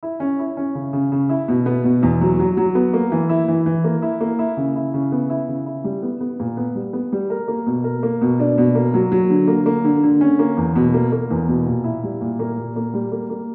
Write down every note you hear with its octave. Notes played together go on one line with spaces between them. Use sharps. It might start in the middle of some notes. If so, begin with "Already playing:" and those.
E4
C#4
E4
C#4
C#3
C#3
C#3
E4
B2
B3
B2
E2
F#3
F#3
F#3
B3
A#3
E3
E4
E3
E3
A#3
E4
A#3
E4
C#3
E4
C#3
B3
E4
C#3
E4
G3
B3
B3
A#2
B3
G3
B3
G3
A#4
A#3
B2
A#4
A#3
B2
D4
B2
A#3
F#3
F#3
D3
A#3
A#3
D3
D3
C#4
A#3
E2
B2
A#3
A#3
E2
B2
A#2
E4
G3
A#2
A#3
A#2
A#3
G3
A#3
A#3